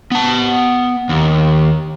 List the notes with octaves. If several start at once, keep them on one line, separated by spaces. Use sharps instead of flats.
B3 A5
D#2